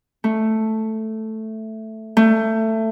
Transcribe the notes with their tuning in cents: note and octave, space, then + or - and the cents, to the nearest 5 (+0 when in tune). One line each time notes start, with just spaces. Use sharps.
A3 +0
A3 +15